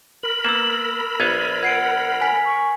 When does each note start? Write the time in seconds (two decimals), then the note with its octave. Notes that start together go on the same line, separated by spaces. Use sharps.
0.23 A#4 B5 F#7
0.45 A#3 B3 E6 E7
1.20 A#1 B3 F5 G#6 D#7
1.63 F#5 G#6 C7 D7
2.21 G#5 B6
2.45 C#6